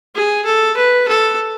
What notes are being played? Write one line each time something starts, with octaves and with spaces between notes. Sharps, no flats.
G#4
A4
B4
A4